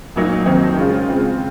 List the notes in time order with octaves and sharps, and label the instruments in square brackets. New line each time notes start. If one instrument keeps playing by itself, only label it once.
[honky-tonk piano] A#2 F#3 A#3 D#4
F2 D#3 F#3 C4 D#4
C#3 G#3 C#4 F4
C#3 G#3 C4 F4